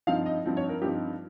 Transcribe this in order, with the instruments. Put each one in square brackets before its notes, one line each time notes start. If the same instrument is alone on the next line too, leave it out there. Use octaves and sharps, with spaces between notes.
[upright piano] G2 F3 C4 D#4 F5
D#5
G2 F3 C4 D#4
C#5
A#4
G2 F3 C4 D#4 G4